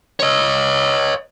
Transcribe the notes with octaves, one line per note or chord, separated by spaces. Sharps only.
C#5 D#5